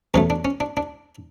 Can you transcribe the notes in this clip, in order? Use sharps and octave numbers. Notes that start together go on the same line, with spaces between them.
E2 B2 F#3 A3 C#4
D4
C#4
D4
D4